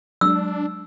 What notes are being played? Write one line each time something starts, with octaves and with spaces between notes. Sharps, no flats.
F#3 G#3 D4 E6